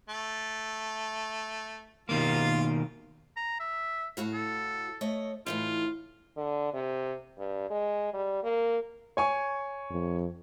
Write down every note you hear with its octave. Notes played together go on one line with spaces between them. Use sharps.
A3
B2 D#3 A#3 F4 F5
A#5
E5
A2 F#4 F5
A4
A3 C#5 D#5
A2 E3 D#4 F4
D3
C3
G2
G#3
G3
A#3
C#5 G#5 C#6
F2